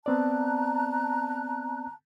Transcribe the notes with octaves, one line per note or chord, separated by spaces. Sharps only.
B3 C4 D5 A5 A#5 F#6